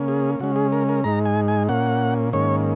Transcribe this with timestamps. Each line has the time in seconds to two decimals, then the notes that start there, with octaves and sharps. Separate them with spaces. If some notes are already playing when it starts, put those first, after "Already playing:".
Already playing: C#3 A#3 C#4
0.08 G#4
0.40 C#3 G#3 C#4 F#4
0.56 G#4
0.72 A#4
0.89 A#4
1.04 G#2 G#3 D#4 A#5
1.25 G#5
1.48 G#5
1.68 A#2 A#3 C#4 F#5
2.33 G#2 D#3 A#3 C#4 C#5